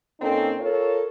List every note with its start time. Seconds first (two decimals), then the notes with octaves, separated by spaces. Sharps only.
0.21 A#2 A#3 C4 C#4 D#4 A4
0.59 F4 A4 A#4 C#5